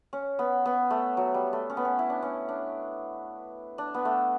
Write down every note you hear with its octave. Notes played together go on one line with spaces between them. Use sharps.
C#4
B3
B3
A3
F#3
G3
A3
C#4
B3
C#4
E4
D4
C#4
D4
D4
B3
A3